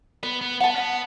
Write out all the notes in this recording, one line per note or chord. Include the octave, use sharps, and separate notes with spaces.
B3 B4
B3
B3 F#5 A5
C#4
B3